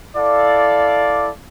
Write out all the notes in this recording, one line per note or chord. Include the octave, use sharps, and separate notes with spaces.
E4 A4 D5 F5